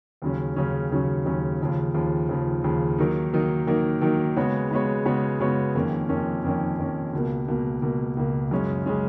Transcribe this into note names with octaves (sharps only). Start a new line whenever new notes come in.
D#2 C#3 F#3 C#4
D#2 C#3 F#3 C#4
D#2 C#3 F#3 C#4
D#2 C#3 F#3 C#4
D#2 C#3 F3
D#2 C#3 F3
D#2 C#3 F3
D#2 C#3 F3
D#3 F#3 A#3 D#4
D#3 F#3 A#3 D#4
D#3 F#3 A#3 D#4
D#3 F#3 A#3 D#4
C#3 G#3 B3 F#4 C#5
C#3 G#3 B3 F#4 C#5
C#3 G#3 B3 F#4 C#5
C#3 G#3 B3 F#4 C#5
F2 D#3 A#3 C#4
F2 D#3 A#3 C#4
F2 D#3 A#3 C#4
F2 D#3 A#3 C#4
C#2 B2 A#3
C#2 B2 A#3
C#2 B2 A#3
C#2 B2 A#3
F#2 C#3 G#3 C#4
C#3 G#3 C#4